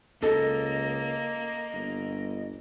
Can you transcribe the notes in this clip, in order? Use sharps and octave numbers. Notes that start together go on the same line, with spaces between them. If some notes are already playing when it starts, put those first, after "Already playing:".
C#2 A#3 A4 D#5
G1